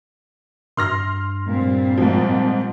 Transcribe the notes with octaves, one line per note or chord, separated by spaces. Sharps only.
G2 C6 F6 A#6
A#2 G3 C4
G#2 F3